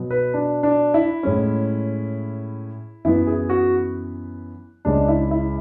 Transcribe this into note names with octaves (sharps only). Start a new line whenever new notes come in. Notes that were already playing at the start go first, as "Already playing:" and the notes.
Already playing: B2 F#3 B3
B4
D4
D4
E4
A2 G#3 C#4
F#2 E3 B3 E4
G#4
F#4
C#2 C#3 G#3 C#4 D4
E4
E4